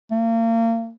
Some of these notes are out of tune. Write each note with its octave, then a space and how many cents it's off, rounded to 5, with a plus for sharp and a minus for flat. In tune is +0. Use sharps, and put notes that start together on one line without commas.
A#3 -35